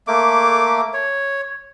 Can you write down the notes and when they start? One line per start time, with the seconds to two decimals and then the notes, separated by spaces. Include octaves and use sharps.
0.07 A3 A#3 D6
0.93 C#5